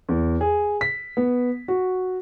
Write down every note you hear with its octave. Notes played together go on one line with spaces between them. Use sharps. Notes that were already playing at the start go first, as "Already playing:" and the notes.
E2
G#4
B6
B3
F#4